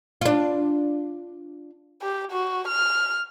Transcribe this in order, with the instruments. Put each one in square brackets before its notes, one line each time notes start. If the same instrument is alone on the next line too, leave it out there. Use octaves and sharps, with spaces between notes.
[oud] D4 F4
[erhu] G4
F#4
F6